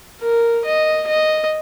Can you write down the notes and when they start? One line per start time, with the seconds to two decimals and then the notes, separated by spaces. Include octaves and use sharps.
0.21 A#4
0.65 D#5
1.07 D#5